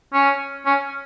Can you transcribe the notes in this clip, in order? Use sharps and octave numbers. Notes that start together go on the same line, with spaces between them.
C#4
C#4